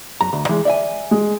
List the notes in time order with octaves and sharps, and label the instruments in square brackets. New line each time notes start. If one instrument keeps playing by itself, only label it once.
[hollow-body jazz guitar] F#2 A#5
D2
E3 G#3
D5 E5 G#5
[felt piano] G#3